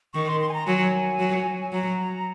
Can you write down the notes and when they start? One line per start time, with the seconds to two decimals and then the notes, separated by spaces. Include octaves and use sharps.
0.14 D#3 C#6
0.27 C6
0.41 C6
0.49 G#5
0.53 A#5
0.67 F#3 G#5
1.19 F#3
1.72 F#3 A#5